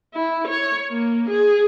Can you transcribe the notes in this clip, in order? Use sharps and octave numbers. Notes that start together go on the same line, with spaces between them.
E4
C#5
A#3
G#4